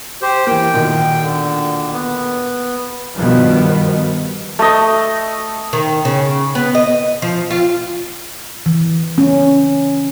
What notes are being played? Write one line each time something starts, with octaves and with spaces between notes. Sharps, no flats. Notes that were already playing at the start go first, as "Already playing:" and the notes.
G4 C5
E3 A#3 G5
B1 A#2 D#3
D3
B3
G2 B2 D#3 F3 G3 B3
A3 D#5
D#3
C#3
B3
D#5
F3
F4
E3
C#4